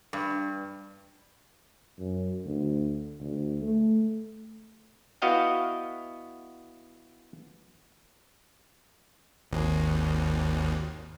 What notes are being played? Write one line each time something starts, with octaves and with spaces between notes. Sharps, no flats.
G2
F#2
D2
D2
A3
B3 E4 F#4 D#5 F5 G5
G#1 D#2